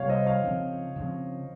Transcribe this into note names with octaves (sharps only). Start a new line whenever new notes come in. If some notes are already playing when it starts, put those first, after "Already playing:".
Already playing: C3 G3 A#3 C#5 F5
C5 D#5
C#5 F5
C#3 F3 C4
C#3 F3 C4